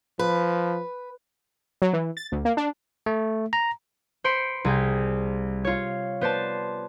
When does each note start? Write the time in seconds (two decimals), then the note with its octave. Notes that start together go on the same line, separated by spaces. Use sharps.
0.19 F3 B4
1.82 F#3
1.93 E3
2.17 A6
2.32 D2
2.45 A#3
2.57 D4
3.06 A3
3.53 A#5
4.24 C5 B5 C6 C#7 D7
4.65 C2 G#4 G5
5.65 F4 C#5
6.21 B3 C5 D5 A5